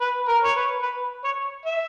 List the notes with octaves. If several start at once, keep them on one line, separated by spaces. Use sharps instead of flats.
B4
A#4
C#5
B4
B4
C#5
E5